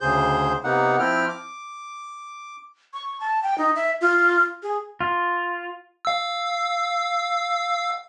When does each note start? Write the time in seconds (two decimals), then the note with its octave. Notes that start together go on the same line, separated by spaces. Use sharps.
0.01 D2 C#3 G#4 C5 G6
0.64 C3 A#3 B3 D#4 F#5
0.99 F3 C4 E4 G5 F6
1.29 D6
2.93 C#6
3.20 A5
3.43 G5
3.58 D#4
3.76 E5
4.01 F4
4.63 G#4
5.01 F4
6.05 F5 E6